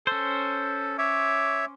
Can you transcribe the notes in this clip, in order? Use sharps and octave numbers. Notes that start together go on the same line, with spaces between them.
C#4 A4 C5
C#5 E5 D6